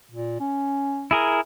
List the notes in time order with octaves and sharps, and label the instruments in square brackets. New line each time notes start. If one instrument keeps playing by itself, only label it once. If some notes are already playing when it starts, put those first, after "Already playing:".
[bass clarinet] A#2
C#4
[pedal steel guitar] E4 G#4 A#4